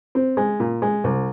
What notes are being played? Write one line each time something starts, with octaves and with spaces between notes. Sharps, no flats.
C4
G#3
A#2
G#3
C2